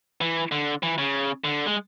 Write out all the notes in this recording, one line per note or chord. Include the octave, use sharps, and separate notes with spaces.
E3
D3
E3
C#3
D3
G#3